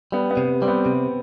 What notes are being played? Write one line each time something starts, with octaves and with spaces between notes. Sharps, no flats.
G3 B3
B3
C3
G3 C4
B3
C3